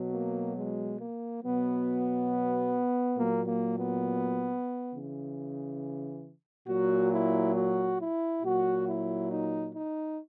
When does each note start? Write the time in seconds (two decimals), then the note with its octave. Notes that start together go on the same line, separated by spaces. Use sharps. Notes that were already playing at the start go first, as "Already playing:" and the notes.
Already playing: B2 F#3
0.12 A#3
0.56 G#3
1.00 A#3
1.43 B2 F#3 B3
3.18 A#2 F#3 A#3
3.47 A#3
3.77 B3
4.93 C#3 E3
6.68 A#2 F#3 F#4
7.12 E4
7.56 F#4
7.99 E4
8.43 A#2 F#3 F#4
8.86 E4
9.30 D#4
9.74 D#4